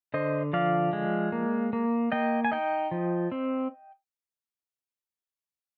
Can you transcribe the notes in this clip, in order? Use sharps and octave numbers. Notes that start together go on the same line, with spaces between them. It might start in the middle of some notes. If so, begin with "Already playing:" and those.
D3 C5 D#5
F3 D5 F5
G#3
A#3
A#3
A#3 D#5 G5
G#5
D#4 D#5 G5
F3
C4